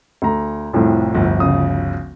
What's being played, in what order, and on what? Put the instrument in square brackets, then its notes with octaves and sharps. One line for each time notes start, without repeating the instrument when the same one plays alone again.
[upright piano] D2 A#5
C2 F2 A2
[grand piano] G1 D2 F3
[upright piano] C#3 D#6